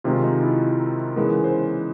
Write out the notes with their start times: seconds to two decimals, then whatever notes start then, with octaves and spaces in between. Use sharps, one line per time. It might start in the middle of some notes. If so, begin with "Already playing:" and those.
0.04 C3 D#3 G#3 F4
0.24 D#4
0.43 E4
1.16 C#3 E3 G#3 B3 A#4
1.44 C5